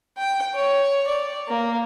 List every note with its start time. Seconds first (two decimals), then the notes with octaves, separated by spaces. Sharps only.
0.18 G5
0.55 C#5
1.07 D5
1.48 A#3